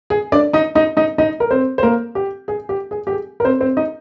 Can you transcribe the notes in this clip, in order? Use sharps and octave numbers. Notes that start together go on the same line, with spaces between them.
G#4
D4 D5
D#4 D#5
D#4 D#5
D#4 D#5
D#4 D#5
A#4
C4 C5
C5
A#3 A#4
G4
G#4
G4
G#4
G4
G#4
A#4
C4 C5
C4 C5
D#4 D#5